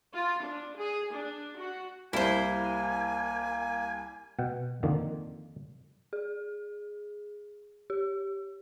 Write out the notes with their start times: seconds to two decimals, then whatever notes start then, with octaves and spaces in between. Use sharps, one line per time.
0.14 F4
0.43 D4
0.77 G#4
1.13 D4
1.58 F#4
2.13 C2 G3 A#3 E4 C5 G#5
4.39 B2 F#5 G5
4.83 F2 D3 D#3 A#3
6.13 G#4
7.90 G4